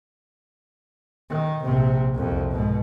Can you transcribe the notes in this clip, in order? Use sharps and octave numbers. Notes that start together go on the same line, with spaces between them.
D#3
A#1 C3
C2 F2
G#2 B2